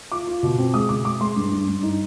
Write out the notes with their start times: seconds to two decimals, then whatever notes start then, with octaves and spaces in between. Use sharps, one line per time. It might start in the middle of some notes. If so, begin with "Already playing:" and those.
0.12 F4 D6
0.27 F4
0.43 B2
0.58 C4
0.74 G#3 D#6
0.89 B2 D6
1.05 G#3 D6
1.21 G#3 C6
1.36 G2
1.52 G2
1.68 G2
1.83 D#4